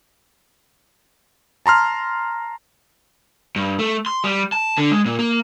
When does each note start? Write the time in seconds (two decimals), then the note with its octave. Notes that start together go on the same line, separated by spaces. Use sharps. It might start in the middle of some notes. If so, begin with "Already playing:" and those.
1.66 A5 A#5 C6 F6
3.56 G2
3.79 A3
4.06 C6
4.24 G3
4.52 A5
4.78 D3
4.91 G#3
5.06 A#2
5.19 A#3